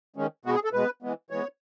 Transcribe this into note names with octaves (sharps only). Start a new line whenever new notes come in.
D#3 G#3 C#4
B2 G#3 B3 F#4
G#4
A4
B2 G#3 B3 B4
E3 G#3 B3
E3 G#3 B3 C#5